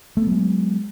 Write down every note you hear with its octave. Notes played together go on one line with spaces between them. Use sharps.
F#3 G#3 A3 B3